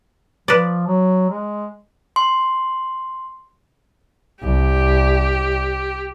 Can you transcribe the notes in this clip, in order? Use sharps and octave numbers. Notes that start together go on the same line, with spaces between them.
F3 B4 D5
F#3
G#3
C6
C2 G4